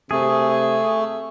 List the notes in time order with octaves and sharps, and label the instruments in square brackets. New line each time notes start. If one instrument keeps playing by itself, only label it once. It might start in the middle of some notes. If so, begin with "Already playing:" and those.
[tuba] C3 [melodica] A3 [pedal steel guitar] G#4